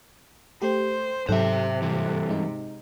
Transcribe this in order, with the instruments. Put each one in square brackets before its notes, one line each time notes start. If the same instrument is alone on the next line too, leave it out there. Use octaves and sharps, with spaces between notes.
[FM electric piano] A3 G4 [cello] C5
[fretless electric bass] G#2 F#3 [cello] C3 [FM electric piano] A4 F#6 [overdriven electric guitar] C5 E5
[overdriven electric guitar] G2 E3
[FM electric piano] G#3 D#4